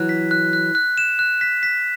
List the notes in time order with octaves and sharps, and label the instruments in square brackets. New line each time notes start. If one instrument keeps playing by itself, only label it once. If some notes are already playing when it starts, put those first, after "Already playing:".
Already playing: [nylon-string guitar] E3 F#3 [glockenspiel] F#6
[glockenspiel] B6
F#6
F#6
F#6
E7
F#6
B6
B6